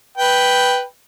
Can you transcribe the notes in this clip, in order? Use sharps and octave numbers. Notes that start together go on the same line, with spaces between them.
B4 G5